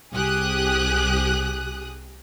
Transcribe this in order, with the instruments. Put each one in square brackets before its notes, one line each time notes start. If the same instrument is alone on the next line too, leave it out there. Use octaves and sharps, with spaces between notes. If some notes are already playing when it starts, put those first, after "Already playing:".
[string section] C2 G4 G#4 D#6 F#6